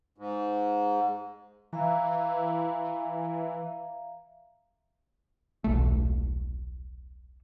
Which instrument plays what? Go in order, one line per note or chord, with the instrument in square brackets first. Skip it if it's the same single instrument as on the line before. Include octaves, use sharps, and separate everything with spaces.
[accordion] G#2
[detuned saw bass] E3 [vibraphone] E5 F5 A#5
[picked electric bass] D#1 B1 A3